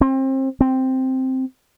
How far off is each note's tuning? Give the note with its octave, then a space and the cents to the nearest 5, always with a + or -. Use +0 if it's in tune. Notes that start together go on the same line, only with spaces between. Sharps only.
C4 +30
C4 +0